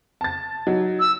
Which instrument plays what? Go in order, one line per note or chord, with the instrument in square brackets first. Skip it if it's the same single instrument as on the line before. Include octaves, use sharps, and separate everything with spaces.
[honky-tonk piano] A5 A6
F#3 D#4
[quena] E6